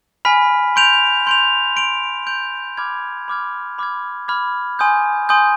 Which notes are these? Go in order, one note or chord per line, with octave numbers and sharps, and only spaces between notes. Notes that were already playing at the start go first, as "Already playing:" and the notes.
G#5 B5 F6 B6
C6 G6 D7 F7
C6 G6 D7 F7
C6 G6 D7 F7
C6 G6 D7 F7
B5 D6 F6 G#6
B5 D6 F6 G#6
B5 D6 F6 G#6
B5 D6 F6 G#6
G#5 C6 D#6 G6
G#5 C6 D#6 G6